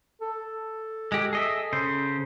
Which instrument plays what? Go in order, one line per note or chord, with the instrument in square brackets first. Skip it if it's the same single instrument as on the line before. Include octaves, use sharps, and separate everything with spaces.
[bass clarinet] A4
[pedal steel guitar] G#3 G4
G#4 D#5 E5
C#3 C5